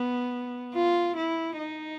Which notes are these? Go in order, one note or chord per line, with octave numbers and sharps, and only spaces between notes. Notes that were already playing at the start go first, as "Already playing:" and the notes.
Already playing: B3
F4
E4
D#4